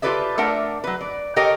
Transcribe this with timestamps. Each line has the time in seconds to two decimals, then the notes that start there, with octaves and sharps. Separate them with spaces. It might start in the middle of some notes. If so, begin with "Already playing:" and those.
0.02 F4 G4 A4 B4 D5 E5
0.38 A3 D4 A#4 D5 E5 F#5
0.84 F#3 B4
1.01 D5
1.36 G4 A4 A#4 C#5 D#5 G5